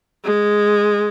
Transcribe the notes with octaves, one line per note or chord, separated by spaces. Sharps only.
G#3